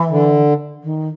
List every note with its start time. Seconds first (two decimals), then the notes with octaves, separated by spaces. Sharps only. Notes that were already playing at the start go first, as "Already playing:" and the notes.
Already playing: E3
0.11 D3
0.83 D#3